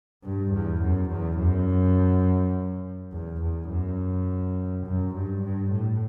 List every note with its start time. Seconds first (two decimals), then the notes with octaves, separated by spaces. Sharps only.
0.24 G2
0.53 E2
0.82 F#2
1.10 E2
1.39 F#2
3.13 E2
3.41 E2
3.71 F#2
4.86 F#2
5.14 G2
5.43 G2
5.71 A2